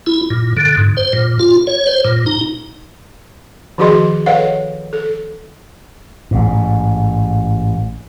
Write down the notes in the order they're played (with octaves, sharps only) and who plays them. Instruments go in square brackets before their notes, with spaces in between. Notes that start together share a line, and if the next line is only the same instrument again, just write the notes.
[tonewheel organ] E4
A#2
D3
G#2
C5
A#2
F4
C#5
C5
A#2
D#4
[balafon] D#3 F3 F#4 G#4 D#5 C6
A4 B4 C#5 D#5 F5 F#5
A4
[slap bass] A1 G#2